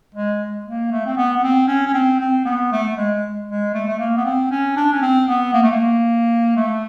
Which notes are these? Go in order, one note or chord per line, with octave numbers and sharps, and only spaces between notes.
G#3
A#3
A3
C4
B3
B3
C4
C#4
C#4
C4
C4
B3
A3
A3
G#3
G#3
A3
A3
A#3
B3
C4
C#4
D4
C#4
C4
B3
A#3
A3
A#3
A3